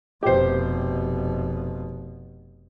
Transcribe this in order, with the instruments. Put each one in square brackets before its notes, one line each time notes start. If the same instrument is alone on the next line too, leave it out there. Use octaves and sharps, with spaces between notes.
[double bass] F1 B2 [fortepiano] G4 C5